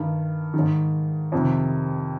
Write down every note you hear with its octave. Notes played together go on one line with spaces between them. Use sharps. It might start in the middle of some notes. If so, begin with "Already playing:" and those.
Already playing: G2 D#3
D#3
G#2
F2 C3 D#3